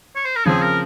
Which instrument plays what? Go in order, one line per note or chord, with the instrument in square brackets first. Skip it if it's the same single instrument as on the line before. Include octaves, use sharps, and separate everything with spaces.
[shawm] C#5
C5
A#4
[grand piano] C#3 F3 C4 [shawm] G#4
[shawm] A#4